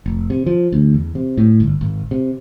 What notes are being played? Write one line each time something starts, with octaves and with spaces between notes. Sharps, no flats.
F1
C3
F3
D2
E2
C3
A2
G1
G#1
C3